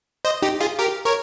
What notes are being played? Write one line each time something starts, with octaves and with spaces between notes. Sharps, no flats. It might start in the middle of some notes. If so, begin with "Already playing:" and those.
C5 D#5
D#4 G4
F4 G#4
G4 A#4
A#4 C#5